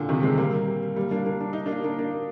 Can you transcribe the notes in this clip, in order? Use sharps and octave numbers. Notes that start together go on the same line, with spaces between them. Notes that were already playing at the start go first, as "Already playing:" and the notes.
Already playing: A#2 D3
C3 D#3
G#3 C4
G3 A#3
G3 A#3
A#3 D4
A#3 D4
D4
D#4
A#3 D4
A#3 D4
A#3 D4